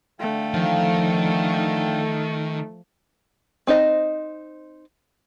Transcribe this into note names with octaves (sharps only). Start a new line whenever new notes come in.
D3 A3 F5 G5
D#3 F3
C4 D#4 C5 D#5